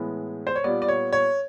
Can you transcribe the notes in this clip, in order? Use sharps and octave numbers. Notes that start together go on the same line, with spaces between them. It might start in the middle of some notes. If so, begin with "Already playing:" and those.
Already playing: A2 E3 G#3 B3
C5
C#5
A#2 G3 B3 D5
D5
C#5
C#5